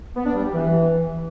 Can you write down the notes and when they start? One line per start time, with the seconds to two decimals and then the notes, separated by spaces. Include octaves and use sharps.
0.16 B3
0.25 D4
0.35 G3
0.44 G4
0.54 E3